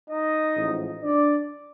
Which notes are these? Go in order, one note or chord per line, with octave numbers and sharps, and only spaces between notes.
D#4 D#5
A1 G#2 F3
D4 D5